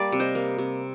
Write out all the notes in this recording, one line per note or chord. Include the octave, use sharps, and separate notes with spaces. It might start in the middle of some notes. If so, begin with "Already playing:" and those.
Already playing: G3 A#3 D5 F5 A5
C3
C5 D#5
A#3
C3